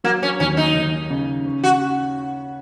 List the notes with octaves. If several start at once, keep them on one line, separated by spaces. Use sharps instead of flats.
F#3 A#3
C#4
D#2 C#4
D#4
D#2
C#3
C#4
F#4